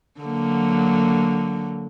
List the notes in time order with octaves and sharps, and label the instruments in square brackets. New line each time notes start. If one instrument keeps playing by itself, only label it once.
[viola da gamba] D3 F#3 A#3